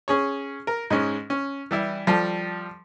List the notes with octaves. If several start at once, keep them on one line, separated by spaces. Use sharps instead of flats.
C#4 G#4 C#5
A#4
G#2 G#3 C#4
C#4
E3 G3 E4
F3 G3 A4